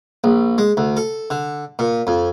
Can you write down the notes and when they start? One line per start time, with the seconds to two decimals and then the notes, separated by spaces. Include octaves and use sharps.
0.24 A#1
0.58 G#3
0.77 D2
0.97 A4
1.30 D3
1.79 A#2
2.07 F2